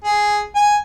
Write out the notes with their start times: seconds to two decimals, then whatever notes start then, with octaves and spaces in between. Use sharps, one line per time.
0.04 G#4
0.55 G#5